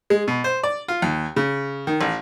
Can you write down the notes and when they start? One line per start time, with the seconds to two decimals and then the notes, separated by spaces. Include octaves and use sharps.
0.10 G#3
0.28 B2
0.44 C5
0.63 D5
0.88 F4
1.02 D#2
1.36 C#3
1.87 D#3
2.01 A1